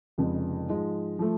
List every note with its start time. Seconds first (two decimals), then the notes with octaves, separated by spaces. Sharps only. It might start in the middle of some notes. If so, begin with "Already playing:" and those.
0.18 F1 F2 C#3 G#3
0.68 G#2 F3 G#3
1.19 F3 A3